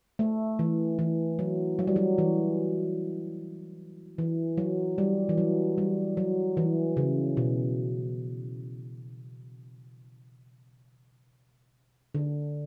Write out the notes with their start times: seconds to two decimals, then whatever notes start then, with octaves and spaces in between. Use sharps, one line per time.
0.19 A3
0.59 E3
0.99 E3
1.39 F#3
1.79 F#3
1.87 G3
1.96 F#3
2.18 E3
4.18 E3
4.58 F#3
4.98 G3
5.29 E3
5.38 F#3
5.78 G3
6.17 F#3
6.57 E3
6.97 C#3
7.37 B2
12.15 D3